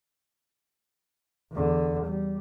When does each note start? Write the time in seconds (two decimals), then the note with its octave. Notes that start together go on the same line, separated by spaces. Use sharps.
1.52 E2 D3
2.06 G3